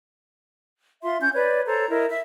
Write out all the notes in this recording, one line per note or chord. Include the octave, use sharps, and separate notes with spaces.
F4 E5 C6
C#4 G6
B4 C#5 D5
A4 C5 C#5 A#5
E4 A#4 D#5
E5